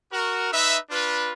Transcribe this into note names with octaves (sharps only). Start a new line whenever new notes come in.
F#4 A#4
D#4 B4 E5
D4 F4 B4